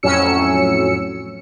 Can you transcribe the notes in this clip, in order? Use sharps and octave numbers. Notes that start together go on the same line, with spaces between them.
F2 A2 F#3 C#4 E6 C#7